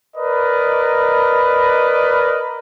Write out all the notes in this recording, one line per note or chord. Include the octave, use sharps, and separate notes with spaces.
A#4 B4 D5 D#5